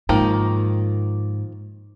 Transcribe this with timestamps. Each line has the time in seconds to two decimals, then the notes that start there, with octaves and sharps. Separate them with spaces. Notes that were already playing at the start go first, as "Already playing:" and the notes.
0.09 G#2 D#3 F3 A#3